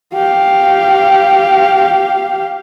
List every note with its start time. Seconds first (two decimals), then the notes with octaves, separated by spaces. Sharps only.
0.14 G4 F5